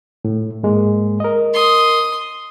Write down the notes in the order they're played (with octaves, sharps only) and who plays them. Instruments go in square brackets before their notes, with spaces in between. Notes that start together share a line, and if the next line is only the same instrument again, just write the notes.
[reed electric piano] A2
G#2 G#3 A#3
A#4 D#5
[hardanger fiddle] C6 D#6